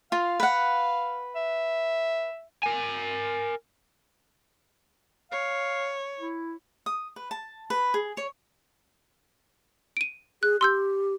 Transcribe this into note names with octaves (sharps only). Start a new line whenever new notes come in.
F4 F5
B4 F#5
E5
A#4 G#5
C#5 F5
E4
D#6
B4
A5
B4
G#4
C#5
D7 D#7
G#4 F#6
G4 C6 E6 G6